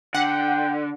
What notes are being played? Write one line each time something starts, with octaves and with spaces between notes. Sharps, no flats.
D3 F#5 G5